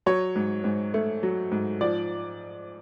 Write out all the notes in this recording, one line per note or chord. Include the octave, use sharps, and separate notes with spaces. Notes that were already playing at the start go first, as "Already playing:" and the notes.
F#3 C#5
G#2
G#2
A3
F#3
G#2
F3 D5